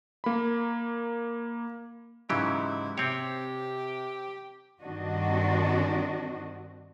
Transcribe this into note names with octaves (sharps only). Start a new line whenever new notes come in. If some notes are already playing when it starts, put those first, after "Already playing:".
A#3 B5
G#2 C#3 E3 F#3 G#3 E4 G4
C3 C4 G4 C#5
G2 D#3 C4 D4 F#4 D#5